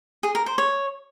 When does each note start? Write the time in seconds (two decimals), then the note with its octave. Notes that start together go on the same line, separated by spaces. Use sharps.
0.23 G#4
0.35 A#4
0.46 C5
0.58 C#5